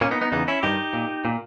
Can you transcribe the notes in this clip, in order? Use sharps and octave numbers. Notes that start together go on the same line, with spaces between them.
A#2 A#3 C#4
B3 D#4
B3 D#4
E2 C#3 E3 B3 D#4
C#4 E4
G2 D#3 D#4 G4
A#2
A#2